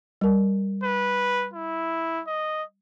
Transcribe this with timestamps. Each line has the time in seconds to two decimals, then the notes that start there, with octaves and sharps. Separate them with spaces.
0.21 G3 A#4
0.84 B4
1.54 E4
2.27 D#5